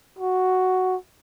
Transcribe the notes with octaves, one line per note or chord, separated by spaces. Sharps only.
F#4